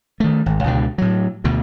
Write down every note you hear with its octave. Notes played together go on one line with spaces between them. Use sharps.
D#3 A3
G#1
C#2 B2 D3
A2 F#3
D2 B2 D3